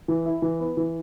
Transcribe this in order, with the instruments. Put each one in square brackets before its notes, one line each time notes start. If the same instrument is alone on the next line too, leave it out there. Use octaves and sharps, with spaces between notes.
[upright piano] E3
E4
E3
B3
E3